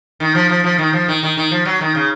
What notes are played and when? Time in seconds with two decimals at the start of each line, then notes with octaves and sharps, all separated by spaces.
0.20 D#3
0.35 F3
0.50 F3
0.64 F3
0.78 D#3
0.93 F3
1.08 D#3
1.23 D#3
1.37 D#3
1.51 F3
1.65 F#3
1.81 D#3
1.95 C#3